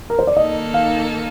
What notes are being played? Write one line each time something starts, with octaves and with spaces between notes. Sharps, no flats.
A#4
C5
D5
D#3 A#3 D#4 A4 D#5
F5